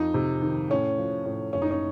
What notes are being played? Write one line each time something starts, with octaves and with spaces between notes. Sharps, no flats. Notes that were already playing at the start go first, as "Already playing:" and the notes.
Already playing: F2 D#4
C3
D#3
A2 C#4
F3
A2
F#1 C#4
D#4
C#4